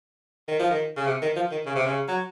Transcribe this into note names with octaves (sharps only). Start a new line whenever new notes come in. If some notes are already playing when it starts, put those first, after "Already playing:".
D#3
F3
D#3
C#3
C3
D#3
F3
D#3
C#3
C3
C#3
F#3